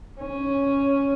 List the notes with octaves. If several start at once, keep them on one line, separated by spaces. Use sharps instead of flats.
C#4